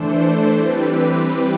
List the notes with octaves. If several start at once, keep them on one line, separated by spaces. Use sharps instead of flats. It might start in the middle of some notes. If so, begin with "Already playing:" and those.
Already playing: E3 A3 D4 A4 C5
E3 G3 C4 G4 B4